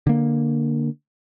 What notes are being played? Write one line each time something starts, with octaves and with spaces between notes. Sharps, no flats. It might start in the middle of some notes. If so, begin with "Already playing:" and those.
D3 A#3